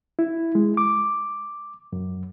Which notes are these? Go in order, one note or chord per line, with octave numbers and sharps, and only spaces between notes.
E4
G#3
D6
F#2